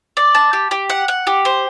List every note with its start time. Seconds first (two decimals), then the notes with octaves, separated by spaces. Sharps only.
0.17 D5
0.35 A5
0.53 G4
0.71 G4
0.90 F#5
1.08 F#5
1.27 G4
1.45 C5